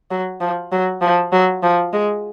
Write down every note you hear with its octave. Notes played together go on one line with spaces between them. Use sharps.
F#3
F3
F#3
F3
F#3
F3
G#3